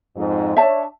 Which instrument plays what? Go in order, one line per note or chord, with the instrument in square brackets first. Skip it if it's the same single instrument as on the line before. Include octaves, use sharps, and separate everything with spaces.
[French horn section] F2 G#2
[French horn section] D4 C#5 [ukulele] E5 A5